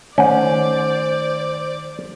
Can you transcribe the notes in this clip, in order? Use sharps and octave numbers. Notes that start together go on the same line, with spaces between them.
D#3 A3 C#4 C5 D5 F#5